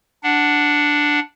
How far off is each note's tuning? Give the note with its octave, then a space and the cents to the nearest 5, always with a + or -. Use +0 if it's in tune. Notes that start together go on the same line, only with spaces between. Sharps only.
D4 +0 F#5 +0